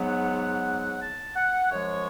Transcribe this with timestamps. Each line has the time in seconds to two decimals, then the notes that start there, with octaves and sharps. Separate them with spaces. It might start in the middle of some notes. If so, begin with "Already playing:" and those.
Already playing: G#2 F#3 B3
0.08 F#5
1.00 A5
1.36 F#5
1.72 F#2 F3 G#3 C#5